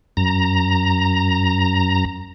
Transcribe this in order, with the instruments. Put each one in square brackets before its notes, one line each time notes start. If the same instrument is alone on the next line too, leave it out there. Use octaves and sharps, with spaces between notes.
[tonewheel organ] F#2 A#5